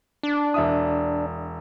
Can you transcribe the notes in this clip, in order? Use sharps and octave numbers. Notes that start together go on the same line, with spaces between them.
D4
E1 E5 D#6